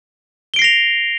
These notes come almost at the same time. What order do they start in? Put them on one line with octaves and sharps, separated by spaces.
G7 D7 C7 A#6 F7